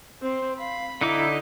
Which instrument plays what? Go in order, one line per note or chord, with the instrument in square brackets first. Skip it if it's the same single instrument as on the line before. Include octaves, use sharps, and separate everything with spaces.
[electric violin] C4 [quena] C5
[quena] F5 [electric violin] B5
[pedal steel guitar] D3 D#4 D6 [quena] E4